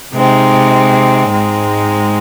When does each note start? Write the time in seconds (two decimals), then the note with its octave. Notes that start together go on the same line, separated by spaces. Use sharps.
0.13 C3 G#3 C4 D#4
1.30 G#2 G#3 C4 D#4